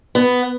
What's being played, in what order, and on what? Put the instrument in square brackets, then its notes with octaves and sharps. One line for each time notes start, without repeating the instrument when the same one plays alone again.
[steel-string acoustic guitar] B3